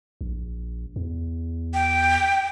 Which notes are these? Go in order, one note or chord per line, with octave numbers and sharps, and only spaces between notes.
A#1
E2
G5